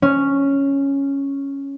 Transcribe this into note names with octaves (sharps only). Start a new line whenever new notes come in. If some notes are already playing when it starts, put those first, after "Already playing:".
C#4